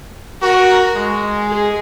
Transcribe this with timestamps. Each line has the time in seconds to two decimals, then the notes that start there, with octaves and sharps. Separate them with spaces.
0.42 F#4 A#4
0.96 G#3
1.50 G#4